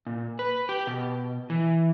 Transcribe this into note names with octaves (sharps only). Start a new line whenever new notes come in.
A#2
B4
G4
B2
E3